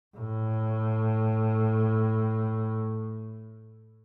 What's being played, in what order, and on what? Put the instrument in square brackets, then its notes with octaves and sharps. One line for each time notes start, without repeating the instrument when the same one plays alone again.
[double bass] A2